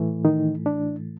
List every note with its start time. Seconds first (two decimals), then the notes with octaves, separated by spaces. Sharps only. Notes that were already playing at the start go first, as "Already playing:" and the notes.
Already playing: A2 E3 A3
0.25 D#3 D#4
0.66 D4